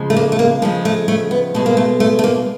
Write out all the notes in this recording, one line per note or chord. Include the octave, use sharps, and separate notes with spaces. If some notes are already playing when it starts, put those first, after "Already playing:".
Already playing: C#3 F3 G#3
A3
A#3
A3
A#3
C#3 F3 G#3 A3
A3
A3
B3
B2 G#3 A3
A#3
A3
A3
A3
A#3